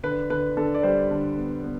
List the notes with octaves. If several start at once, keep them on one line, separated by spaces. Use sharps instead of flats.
D3 B4
D3 B4
D3 A4
D5
G3 C5
D3
B3
B3